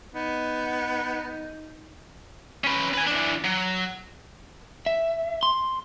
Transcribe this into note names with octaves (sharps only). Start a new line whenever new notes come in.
B3 D#4
C#4 B4
B4 G#5
E3 D4
F#3
E5
C6